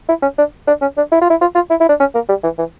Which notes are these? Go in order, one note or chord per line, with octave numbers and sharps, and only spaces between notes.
E4
C#4
D4
D4
C#4
D4
E4
F4
E4
F4
F4
E4
E4
D4
C#4
A#3
G3
E3
E3